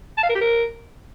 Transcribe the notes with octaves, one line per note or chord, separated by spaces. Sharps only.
A5
F5
A#4
G4
A#4